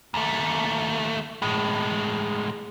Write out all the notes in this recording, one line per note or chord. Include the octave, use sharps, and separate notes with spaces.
D#2 A3
A2 G#3